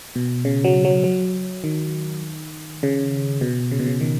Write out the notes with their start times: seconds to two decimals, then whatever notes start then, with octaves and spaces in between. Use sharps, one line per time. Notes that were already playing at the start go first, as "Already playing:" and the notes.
0.15 B2
0.45 C#3
0.64 F#3
0.85 F#3
1.04 F#3
1.64 D#3
2.83 C#3
3.41 B2
3.71 C#3
3.79 B2
3.87 C#3
4.01 D#3